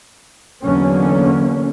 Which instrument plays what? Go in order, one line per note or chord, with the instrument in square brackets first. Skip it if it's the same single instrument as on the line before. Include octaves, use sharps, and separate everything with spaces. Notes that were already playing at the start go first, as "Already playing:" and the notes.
[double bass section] E2 D3 F#3 A#3 C#4